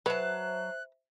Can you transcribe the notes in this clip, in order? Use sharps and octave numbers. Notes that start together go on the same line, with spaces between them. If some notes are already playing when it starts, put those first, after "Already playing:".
F#3 B4 C5 E5 A5 F#6